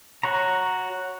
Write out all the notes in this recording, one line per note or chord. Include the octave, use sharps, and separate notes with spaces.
F#4 C#5 A#5